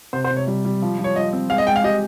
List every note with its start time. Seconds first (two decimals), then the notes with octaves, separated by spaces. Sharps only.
0.13 C3 C5
0.24 C5
0.31 C3
0.36 C#5
0.47 G3
0.65 G3
0.82 F3
0.99 F3
1.04 C#5
1.15 F3 D#5
1.33 C4
1.49 G#3 F5
1.58 D#5
1.67 G#3 G5
1.76 F5
1.84 G4 D#5